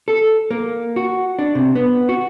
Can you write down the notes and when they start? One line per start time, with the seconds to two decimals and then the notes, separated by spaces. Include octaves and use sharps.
0.08 A4
0.51 A#3
0.96 F#4
1.39 D4
1.55 C3
1.75 B3
2.09 F#4